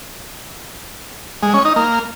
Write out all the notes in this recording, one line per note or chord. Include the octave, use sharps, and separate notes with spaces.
G#3
C#4
D#4
A#3